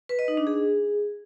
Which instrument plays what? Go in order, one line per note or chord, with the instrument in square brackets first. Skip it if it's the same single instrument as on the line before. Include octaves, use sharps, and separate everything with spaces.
[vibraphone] B4
D#5
D#4
D4
G#4